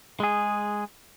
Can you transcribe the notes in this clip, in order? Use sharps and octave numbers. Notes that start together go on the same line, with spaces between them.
G#3 G#4